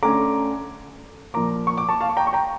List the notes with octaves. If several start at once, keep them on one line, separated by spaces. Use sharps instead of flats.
D3 A3 C#4 A#5 D6
A#2 F3 A#3 A#5 D6
C#6
D6
A5 C#6
F5 A5
C#6
G5 A#5
C#6
G5 A#5